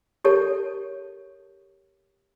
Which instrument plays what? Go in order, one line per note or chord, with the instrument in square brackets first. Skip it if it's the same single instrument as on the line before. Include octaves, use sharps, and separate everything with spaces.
[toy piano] G4 A4 A#4 C#5 A5